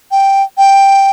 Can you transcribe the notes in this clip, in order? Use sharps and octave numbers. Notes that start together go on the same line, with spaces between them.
G5
G5